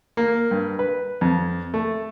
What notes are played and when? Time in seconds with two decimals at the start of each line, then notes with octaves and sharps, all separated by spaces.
0.17 A#3
0.51 G2
0.79 B4
1.21 F2
1.74 A3